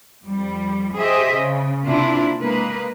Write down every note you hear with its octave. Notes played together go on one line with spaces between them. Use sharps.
F2 G3
G4 G#4 C5 D#5 E5
C#3
C3 A#3 D4 E4 F4
G#3 A#3 B4